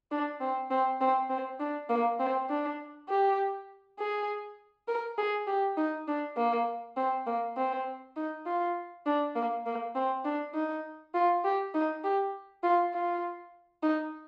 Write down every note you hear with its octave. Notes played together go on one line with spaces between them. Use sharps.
D4
C4
C4
C4
C4
D4
A#3
C4
D4
G4
G#4
A#4
G#4
G4
D#4
D4
A#3
C4
A#3
C4
D#4
F4
D4
A#3
A#3
C4
D4
D#4
F4
G4
D#4
G4
F4
F4
D#4